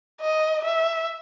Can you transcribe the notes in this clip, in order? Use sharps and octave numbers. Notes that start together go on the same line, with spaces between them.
D#5
E5